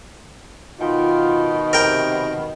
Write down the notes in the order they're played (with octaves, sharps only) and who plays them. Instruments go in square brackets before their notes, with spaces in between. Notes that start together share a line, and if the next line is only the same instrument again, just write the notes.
[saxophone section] B2 D#3 [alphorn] F4
[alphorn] C3 [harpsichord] A#4 G5